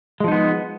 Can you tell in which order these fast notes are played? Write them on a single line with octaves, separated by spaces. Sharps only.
G#3 F3 D#4 B3